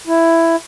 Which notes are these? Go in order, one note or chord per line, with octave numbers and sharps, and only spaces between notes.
E4